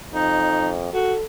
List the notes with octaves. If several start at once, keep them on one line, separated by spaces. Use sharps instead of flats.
F2 D#4
F#4 A4